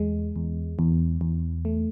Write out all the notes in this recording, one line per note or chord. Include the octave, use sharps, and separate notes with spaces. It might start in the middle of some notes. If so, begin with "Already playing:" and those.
Already playing: E2 G#3
E2
E2
E2
A3